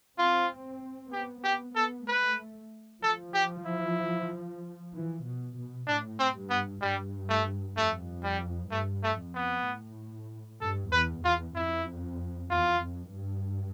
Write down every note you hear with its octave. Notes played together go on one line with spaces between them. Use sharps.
C4 F4
B3 G4
B3 G4
B3 A4
A3 B4
F3 A4
G4
E4
E3
B2
B2
A2 D4
C4
G2
B3
G2 G3
A3
F2 A3
G3
G2 A3
A3
F2
B3
A2
G2 A4
E2 B4
E2 F4
F2 E4
E2 F4
F2
G2